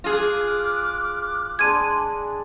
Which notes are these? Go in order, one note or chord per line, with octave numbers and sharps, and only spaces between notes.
F4 G#4 D6 F6 F#6
G#3 D4 G#6 D#7